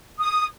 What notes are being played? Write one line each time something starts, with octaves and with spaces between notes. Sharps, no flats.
D#6